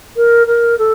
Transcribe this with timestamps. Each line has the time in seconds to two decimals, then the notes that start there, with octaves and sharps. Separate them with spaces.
0.16 A#4
0.47 A#4
0.78 A4